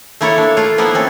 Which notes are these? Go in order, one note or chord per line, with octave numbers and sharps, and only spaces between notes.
A3 A#3 E4 A4 C#5
D4
A3 F4
F3 A#3 B3 E4
C4 C#4 A4